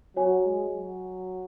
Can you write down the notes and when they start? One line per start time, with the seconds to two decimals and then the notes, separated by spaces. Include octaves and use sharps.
0.16 F#3 F#4 C#5 G#5
0.45 G#3
0.72 F#3